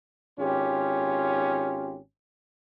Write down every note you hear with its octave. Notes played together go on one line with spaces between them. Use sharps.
G#1 C#4 F4 G4